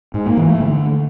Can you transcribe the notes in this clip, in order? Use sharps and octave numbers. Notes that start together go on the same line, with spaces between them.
G#2
A#3
E3
A3
D3